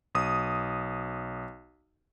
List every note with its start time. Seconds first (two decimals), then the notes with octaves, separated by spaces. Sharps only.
0.15 B1 D#6